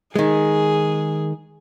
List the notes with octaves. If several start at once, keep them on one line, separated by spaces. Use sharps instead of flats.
D#3 G#3 G#4